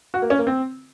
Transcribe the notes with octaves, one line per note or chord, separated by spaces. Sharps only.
F#4
A#3
C#4
A#3
C4